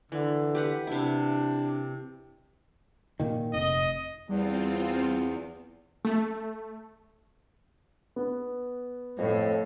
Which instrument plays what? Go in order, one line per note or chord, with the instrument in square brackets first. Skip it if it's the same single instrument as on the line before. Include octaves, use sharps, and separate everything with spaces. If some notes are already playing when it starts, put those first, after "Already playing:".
[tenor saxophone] D3 [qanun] E3
[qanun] G4 B4 F#5
[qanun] C3 E4 [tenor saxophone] D4
[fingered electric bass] A#2 D#3
[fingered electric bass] F1 [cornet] D#5
[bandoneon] E2 [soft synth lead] G3 [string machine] C4 F4
[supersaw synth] A3
[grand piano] B3
[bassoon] F2 [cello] A2